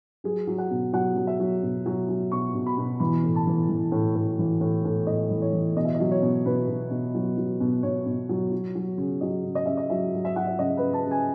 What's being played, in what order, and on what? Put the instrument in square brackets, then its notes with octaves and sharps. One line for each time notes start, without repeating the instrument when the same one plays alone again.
[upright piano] F#3 G#4
F#3
F#5
B2
F#3 F#5
F#3
E5
F#3
B2
F#3
F#3
B2 C#6
B2
B5
B2
E3 B5
A2
A5
E3
E3
A2
A2
E3
A2
A2
A2 D#5
E3
C#5
E3
B2 D#5
E5
D#5
F#3
C#5
B2
B2 B4
B2
B2
F#3
F#3
B2
B2 C#5
B2
F#3
F#3
F#3
C#3
F#3 D#5
C#3
D#5
C#3 E5
D#5
F#3 E5
F#3
E5
F#3 F#5
E5
C#3 D#5
C#3 B4
A5
C#3
G#5